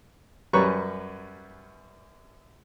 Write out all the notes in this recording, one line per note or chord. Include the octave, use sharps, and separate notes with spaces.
F#2 G3 C#4 B4 A#5 C#6